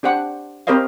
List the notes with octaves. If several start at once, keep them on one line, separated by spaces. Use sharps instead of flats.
D4 G4 C5 F#5
C4 G4 A#4 C5 D#5 F5